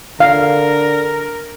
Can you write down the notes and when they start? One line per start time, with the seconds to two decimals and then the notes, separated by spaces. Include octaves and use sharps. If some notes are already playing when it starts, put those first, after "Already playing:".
0.20 D3 A#4 F5